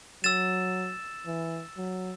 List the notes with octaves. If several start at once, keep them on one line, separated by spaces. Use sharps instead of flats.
F#3 E6 A6 E7
E3
F#3